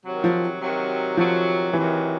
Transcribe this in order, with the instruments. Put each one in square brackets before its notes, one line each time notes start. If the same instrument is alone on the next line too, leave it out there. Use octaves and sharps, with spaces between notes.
[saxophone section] C3 D#3 F#3
[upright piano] F3
[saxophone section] C3 D#3 F#3
[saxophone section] C3 D#3 F#3 [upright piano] F3
[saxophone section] C3 D#3 F#3 [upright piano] E3